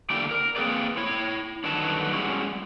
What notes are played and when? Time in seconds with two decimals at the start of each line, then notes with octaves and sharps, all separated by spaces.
0.10 D3 A#3 E4 G4 D5
0.31 A#4
0.56 A#3 C4 G#4 B4 D5
0.97 E4 C#5
1.64 G2 D3 D#3 F#3 B4 A5
2.12 G3 G#3 C#4 E4 F#4